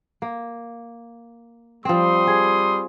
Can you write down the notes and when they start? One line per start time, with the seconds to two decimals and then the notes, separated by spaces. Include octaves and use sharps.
0.22 A#3
1.85 F3 G3 C4 C6 D#6
2.27 G#4